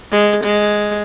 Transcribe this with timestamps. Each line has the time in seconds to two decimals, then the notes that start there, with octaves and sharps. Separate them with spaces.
0.12 G#3
0.44 G#3